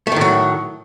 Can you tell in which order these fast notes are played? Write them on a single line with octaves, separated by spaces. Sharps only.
A3 D#3 A2 F#3